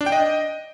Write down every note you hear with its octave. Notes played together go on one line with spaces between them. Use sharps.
D4
G5
D#5